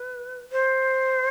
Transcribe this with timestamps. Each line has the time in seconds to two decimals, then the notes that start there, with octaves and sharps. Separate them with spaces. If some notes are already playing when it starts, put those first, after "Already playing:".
Already playing: B4
0.52 C5